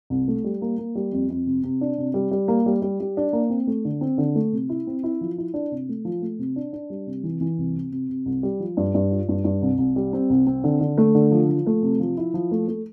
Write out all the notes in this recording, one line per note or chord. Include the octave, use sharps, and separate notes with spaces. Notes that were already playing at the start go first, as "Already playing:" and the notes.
C2
A3
G3
A#3
A#3
G3
F2
F2
C3
C3
D4
C3
G3
G3
A#3
G3
G3
G3
D4
A#3
C4
A3
D3
C4
D3
A3
C3
E4
C4
E4
F3
E4
D4
C3
A3
F3
A3
C3
D4
D4
G3
C3
E3
E3
C2
C3
C3
C3
C2
G3
F3
G2
G2
F4
G2
G2
C2
C2
G3
C4
C2
C4
D3
D3
A3
D3
F3
F3
A3
C3
F3
E4
F3
A3
A3